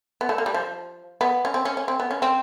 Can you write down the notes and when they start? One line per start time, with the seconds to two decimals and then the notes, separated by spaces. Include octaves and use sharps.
0.21 B3
0.29 A3
0.38 A#3
0.46 G3
0.54 F3
1.21 B3
1.45 C#4
1.54 C4
1.65 C#4
1.77 C#4
1.88 C4
2.00 B3
2.11 C#4
2.22 C4